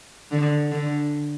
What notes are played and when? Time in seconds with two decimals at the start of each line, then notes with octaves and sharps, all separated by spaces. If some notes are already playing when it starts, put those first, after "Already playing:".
0.31 D3
0.71 D3